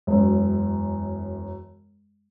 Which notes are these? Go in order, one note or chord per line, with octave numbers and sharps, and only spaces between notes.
E1 F#2